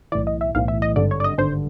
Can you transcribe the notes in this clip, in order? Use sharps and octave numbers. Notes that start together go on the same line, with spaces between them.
B1 A2 E3 D5
D#5
E5
B1 A2 E3 F5
E5
D#5
G#1 G2 D3 D5
C#5
D5
D#5
G#1 G2 D3 C5